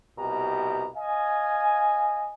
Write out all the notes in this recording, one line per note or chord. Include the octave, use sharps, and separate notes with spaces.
C2 B2 G4 D#5 A#5
D#5 F5 G#5